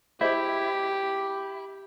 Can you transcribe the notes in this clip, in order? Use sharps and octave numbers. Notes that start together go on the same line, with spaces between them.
E4 G4 C5 D#5 E5